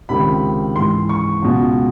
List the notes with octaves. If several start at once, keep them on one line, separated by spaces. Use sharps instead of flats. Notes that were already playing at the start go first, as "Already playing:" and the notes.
C#2 C3 D#3 B5
G#2 E3 C6
C#6
C#2 B2